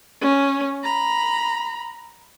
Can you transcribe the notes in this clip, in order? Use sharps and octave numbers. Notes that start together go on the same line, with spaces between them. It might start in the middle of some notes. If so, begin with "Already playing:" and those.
C#4
A#5 B5